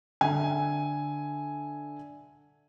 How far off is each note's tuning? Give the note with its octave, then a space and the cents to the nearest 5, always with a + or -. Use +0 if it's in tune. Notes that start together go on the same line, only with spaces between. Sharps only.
D3 +0 E5 -10 G#5 +0